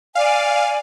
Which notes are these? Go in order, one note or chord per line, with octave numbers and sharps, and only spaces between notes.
D5 F5 G#5